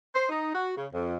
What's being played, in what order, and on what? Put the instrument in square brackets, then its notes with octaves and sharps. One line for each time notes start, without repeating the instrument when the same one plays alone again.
[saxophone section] C5
D#4
F#4
C#3
F2